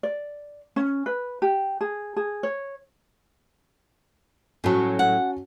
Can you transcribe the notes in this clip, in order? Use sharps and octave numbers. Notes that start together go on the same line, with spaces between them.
D5
C#4
B4
G4
G#4
G#4
C#5
A2 F#3 C#4 F#4 A5
F#5